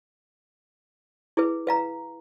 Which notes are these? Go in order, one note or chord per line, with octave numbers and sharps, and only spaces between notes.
E4 G#4 B4
B4 F5 A#5